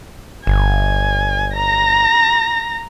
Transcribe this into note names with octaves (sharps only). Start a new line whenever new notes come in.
G1 G#5
A#5 A#6